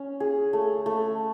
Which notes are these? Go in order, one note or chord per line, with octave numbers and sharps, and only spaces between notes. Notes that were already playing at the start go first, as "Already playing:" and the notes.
Already playing: C#4
G#4
A3
A3